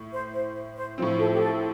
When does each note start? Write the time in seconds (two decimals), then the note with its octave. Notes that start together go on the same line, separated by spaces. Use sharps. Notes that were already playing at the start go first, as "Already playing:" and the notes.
Already playing: A2
0.12 C5
0.33 C5
0.76 C5
0.98 A2 F3 C4
1.19 A4
1.33 G4
1.40 A4